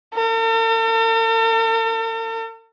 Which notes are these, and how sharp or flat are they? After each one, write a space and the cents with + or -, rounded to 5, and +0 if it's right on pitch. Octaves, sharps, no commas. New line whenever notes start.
A4 +45